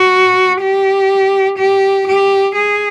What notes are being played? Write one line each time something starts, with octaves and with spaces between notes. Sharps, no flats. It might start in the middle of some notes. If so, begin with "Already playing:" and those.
Already playing: F#4
G4
G4
G4
G#4